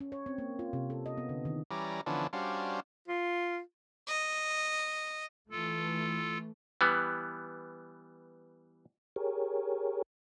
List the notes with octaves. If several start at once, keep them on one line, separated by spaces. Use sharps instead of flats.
C#4
C#5
C4
A#3
F4
C3
A4
D#5
B3
D3
D#3
E3 G3 C#4 D5 A#5
D3 E3 F3 B3 C#4 D4
G3 C#4 D4 F#4 C5 F5
F4
D#5
E3 A3 F4 A4
E3 G3 B3
G4 G#4 A#4 C#5